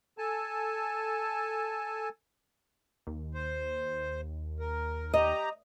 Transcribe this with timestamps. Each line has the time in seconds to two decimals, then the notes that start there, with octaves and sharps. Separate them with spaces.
0.18 A4 G#5 A5
3.07 D#2
3.34 C5
4.60 A#4
5.14 G4 D#5 A#5